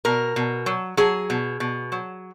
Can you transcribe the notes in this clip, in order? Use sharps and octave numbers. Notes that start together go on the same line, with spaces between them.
B2 A#4
B2
F#3
F#3 G#4
B2
B2
F#3